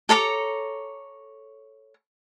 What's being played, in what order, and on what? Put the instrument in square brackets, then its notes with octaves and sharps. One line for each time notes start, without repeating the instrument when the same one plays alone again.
[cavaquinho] A4 C#5 A#5 D6